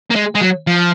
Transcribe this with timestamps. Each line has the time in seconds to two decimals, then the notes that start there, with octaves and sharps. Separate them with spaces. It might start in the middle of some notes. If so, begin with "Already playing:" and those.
0.10 A#3
0.15 G#3
0.35 G#3
0.41 F#3
0.67 F3